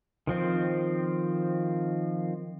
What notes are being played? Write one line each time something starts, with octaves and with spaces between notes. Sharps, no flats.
D#3 F3 C4